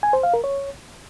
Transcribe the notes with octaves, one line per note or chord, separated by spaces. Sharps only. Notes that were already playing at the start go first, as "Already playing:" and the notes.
G#5
C5
F5
A#4
C#5